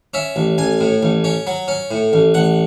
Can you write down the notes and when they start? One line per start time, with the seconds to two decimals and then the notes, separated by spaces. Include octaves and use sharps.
0.14 C#4 E5
0.36 A1
0.58 A1 G#5
0.80 A2
1.03 A1
1.24 C#4
1.47 F#3
1.68 C#4
1.91 A2
2.13 A1
2.34 A1 F#5